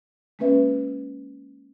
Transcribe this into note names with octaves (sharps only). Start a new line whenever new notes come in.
G#3 A#3 C#4 B4 E5